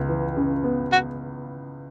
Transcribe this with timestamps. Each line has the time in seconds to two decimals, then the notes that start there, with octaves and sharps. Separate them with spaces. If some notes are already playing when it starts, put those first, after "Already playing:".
Already playing: C#2 B3
0.09 E3
0.37 C#3
0.64 B3
0.92 F#4